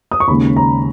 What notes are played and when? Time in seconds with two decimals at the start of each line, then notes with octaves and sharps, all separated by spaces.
0.11 D#6
0.20 C#6
0.28 D#2 C#3 G#3 B5
0.57 A#5